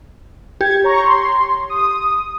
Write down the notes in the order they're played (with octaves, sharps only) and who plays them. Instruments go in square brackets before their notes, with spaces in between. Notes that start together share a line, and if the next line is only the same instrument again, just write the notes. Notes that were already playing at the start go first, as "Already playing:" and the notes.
[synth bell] G4 [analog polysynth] G#6
[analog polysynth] C#5 A#5 C#6
C6
D#6